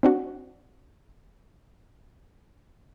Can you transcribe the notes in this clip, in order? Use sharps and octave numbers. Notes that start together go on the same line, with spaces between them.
C4 D4 F#4